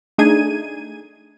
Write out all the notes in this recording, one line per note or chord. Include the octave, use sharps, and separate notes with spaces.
A3 D4 D#4 G#4 G#6 D#7